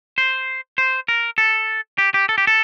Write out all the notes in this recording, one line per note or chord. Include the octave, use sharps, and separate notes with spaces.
C5
C5
A#4
A4
G4
G4
A4
G4
A4